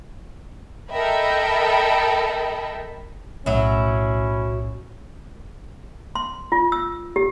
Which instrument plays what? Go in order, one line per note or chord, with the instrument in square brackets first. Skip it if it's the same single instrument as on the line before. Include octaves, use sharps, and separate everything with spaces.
[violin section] A4 A#4 D#5 E5 G5 B5
[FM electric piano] B1 A2 [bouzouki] F#3 E4 [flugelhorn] C#4
[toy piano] C6
F4
E6
G4